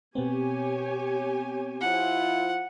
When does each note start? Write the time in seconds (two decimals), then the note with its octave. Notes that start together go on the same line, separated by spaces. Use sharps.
0.15 B2 B3 C4 G4 C#5 G#5
1.81 F3 E4 F4 F#5